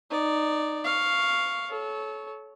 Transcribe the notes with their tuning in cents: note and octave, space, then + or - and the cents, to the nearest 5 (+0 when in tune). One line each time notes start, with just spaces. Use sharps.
D#4 -15 D5 +0
F5 +0 C#6 +5
A4 -30 C#5 +0